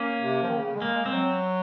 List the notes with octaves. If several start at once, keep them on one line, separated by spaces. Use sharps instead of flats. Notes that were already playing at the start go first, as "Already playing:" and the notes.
Already playing: A#3 C#4
C3
F3
D#3
C#3
G#3
A#3
G#3
C4
F#3